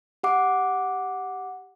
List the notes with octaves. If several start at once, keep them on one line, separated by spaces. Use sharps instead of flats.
G4 F#5 D6